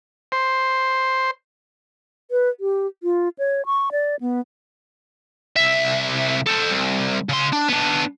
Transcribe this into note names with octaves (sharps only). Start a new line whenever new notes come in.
C5
B4
G4
F4
C#5
C#6
D5
B3
C2 E5
A4 C5
C2
C#3 C6
D4
B3 D4